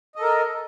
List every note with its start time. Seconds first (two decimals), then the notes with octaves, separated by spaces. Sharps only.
0.16 D#5
0.19 A4
0.22 A#4